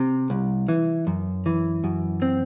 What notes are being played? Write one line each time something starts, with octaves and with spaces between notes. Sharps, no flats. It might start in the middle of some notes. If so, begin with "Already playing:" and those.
Already playing: C3
C2
E3
F#2
E3
F#2
C4